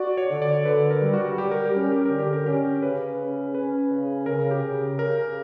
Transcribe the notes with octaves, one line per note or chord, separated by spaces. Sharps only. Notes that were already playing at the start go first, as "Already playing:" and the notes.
Already playing: F#4 D5
C#5
D3
D5
D3 B4
A#4
G3
F#4
G3 G4
A#4
G4
C#4 A#4
G4
D3 A#4
G4
A#4
C#4 G4
C#3 B4
C#4
C#4 B4
C#3
C#3 A#4
G4
C#3
C#3 A#4